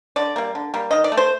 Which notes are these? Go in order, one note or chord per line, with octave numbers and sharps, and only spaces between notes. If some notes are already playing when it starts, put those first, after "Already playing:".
D3 D5
G3 A#3
D3
G3 A#3
D#3 D#5
D5
A3
C5